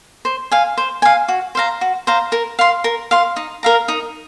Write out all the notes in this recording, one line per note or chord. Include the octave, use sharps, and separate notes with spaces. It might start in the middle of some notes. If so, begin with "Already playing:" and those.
C5
F5 G#5
C5
F5 G#5
F#4
C5 F5 A#5
F#4
C5 F5 A#5
A#4
F5 C6
A#4
F5 C6
D#4
A#4 F5 A#5
D#4